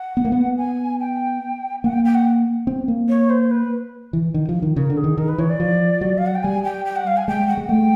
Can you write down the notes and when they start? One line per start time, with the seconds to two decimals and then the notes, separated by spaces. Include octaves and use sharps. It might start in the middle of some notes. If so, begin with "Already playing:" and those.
Already playing: F#5
0.17 B3
0.25 A#3
0.32 B3
0.58 G#5
1.00 G5
1.84 A#3 F#5
1.93 G5
2.05 G5
2.14 F#5
2.67 C4
2.88 A#3
3.09 C#5
3.30 C5
3.51 B4
4.13 E3
4.34 D#3
4.49 F3
4.62 D#3
4.76 C#3 A#4
4.90 D3
4.97 G#4
5.04 D#3
5.17 D#3 A#4
5.28 B4
5.38 E3 C#5
5.50 D5
5.60 F3
6.01 F#3
6.18 F5
6.26 F#5
6.35 G5
6.43 G3 G#5
6.64 G5
6.85 G5
6.96 F#5
7.07 F5
7.17 G#5
7.28 G#3 G5
7.48 F#5
7.57 G#3
7.69 A3 G5